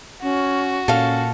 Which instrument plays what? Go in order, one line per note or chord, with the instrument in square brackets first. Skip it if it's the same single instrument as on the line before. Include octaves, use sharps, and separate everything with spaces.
[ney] C#4 [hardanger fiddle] F#4
[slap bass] A#2 [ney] C#4 [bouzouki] A4 F5